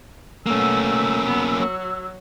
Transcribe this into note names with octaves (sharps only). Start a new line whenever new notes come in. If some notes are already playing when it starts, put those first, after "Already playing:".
B2 A3 A#3 C#4 E6
B3
F#3